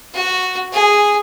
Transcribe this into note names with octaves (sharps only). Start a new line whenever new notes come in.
F#4
G#4